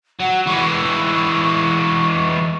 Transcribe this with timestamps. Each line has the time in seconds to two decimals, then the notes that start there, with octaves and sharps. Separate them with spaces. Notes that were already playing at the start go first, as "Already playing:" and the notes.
0.20 F#3 F#5
0.47 E3 G#3 C#6